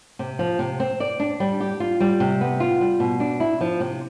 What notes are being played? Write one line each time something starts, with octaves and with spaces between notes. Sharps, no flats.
C3
F3
C3
C4
D5
D4
G3
G4
F4
G3
C3
B3
F4
G3
B2
D4
E4
F3
C3